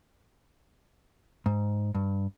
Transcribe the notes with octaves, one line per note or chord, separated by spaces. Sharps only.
G#2
G2